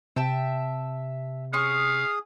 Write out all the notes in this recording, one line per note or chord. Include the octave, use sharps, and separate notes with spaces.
C3 E5 G5 A5
C#4 G#4 F5 C6 C#6 D#6